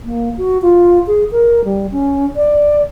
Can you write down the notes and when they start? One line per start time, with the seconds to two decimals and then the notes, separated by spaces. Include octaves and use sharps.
0.05 A#3
0.37 F#4
0.62 F4
1.07 G#4
1.31 A#4
1.64 G3
1.92 C#4
2.36 D5